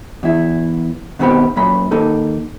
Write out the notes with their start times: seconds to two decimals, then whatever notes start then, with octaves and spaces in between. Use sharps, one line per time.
0.23 E2 E4
1.19 B2 D#3 B3 C4 G4 B5
1.56 F#2 A#2 B5
1.91 D#2 A#3 D#4 A4